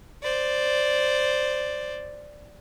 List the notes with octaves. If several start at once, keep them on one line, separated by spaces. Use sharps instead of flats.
C5 D5